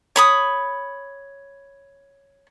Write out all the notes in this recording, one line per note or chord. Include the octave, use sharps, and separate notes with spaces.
C#5 B5 D#6